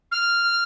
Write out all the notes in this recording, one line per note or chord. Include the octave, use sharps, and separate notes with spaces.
F6